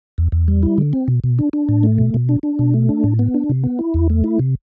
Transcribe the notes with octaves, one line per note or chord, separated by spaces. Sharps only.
E2
E2
G3
E4
D3
C4
B2
B2
D4
D4
A2
A3
B2
B2
D4
D4
B2
A3
D4
A2
B3
D4
C3
B3
E4
E2
A3
E4
C3